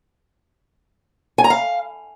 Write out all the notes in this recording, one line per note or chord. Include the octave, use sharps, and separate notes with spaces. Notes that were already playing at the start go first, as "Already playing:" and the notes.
G#5
A#5
F5